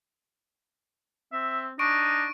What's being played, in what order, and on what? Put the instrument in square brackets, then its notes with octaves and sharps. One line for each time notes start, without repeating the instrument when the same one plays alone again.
[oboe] C4 [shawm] E5
[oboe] D4 [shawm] D#4 [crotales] C#6 D7